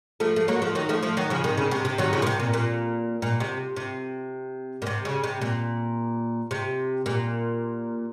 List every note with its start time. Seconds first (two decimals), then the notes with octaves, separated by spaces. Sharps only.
0.20 F3 A3
0.36 A3
0.48 F#3 A#3
0.62 F3 A3
0.75 D#3 F#3
0.89 F3 A3
1.03 F3 A3
1.17 D#3 F#3
1.30 C#3 F3
1.44 C3 D#3
1.57 C#3
1.71 C3
1.85 C3
1.98 D#3 F#3
2.13 C#3 F3
2.22 A#2
2.27 C3
2.40 A#2
2.53 A#2
3.22 A#2
3.40 C3
3.76 C3
4.82 A#2
4.87 C3
5.05 C#3
5.24 C3
5.41 A#2
6.51 C3
7.06 A#2